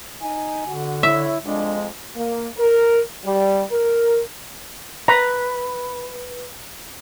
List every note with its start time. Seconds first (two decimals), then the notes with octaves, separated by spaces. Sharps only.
0.21 D#4 G#5
0.67 D3 F#4
1.03 E4 C#5 E5
1.45 F2 G#3 D4
2.16 A#3
2.58 A#4
3.25 G3
3.71 A#4
5.08 B4 A#5